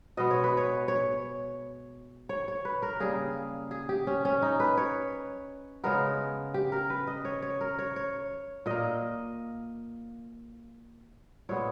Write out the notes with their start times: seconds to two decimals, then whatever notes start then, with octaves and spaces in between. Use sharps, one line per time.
0.17 B2 G#3 B3 D#5
0.31 C#5
0.44 B4
0.57 C#5
0.88 C#5
2.29 C#5
2.48 C#5
2.65 B4
2.82 A#4
3.00 C#3 G3 A#3 G#4
3.71 G#4
3.89 G4
4.07 C#4
4.25 C#4
4.42 D#4
4.60 B4
4.77 C#5
5.84 C#3 G#3 B3 A#4
6.54 G4
6.72 A#4
6.90 B4
7.07 D#5
7.25 C#5
7.42 C#5
7.61 A#4
7.79 C#5
7.96 C#5
8.66 A#2 A#3 D#5
11.49 A#2 G#3 B3 C#5